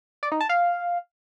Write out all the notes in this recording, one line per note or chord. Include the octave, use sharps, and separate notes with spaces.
D5
D#4
A5
F5